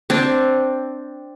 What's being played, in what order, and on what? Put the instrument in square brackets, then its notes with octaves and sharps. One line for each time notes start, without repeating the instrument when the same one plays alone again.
[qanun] C4 D4